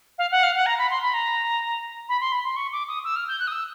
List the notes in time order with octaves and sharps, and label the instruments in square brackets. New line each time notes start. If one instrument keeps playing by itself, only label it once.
[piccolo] F5
F#5
F5
F#5
A#5
B5
C6
B5
A#5
B5
C6
B5
C6
C#6
D6
D#6
E6
F6
G6
F#6
D#6
E6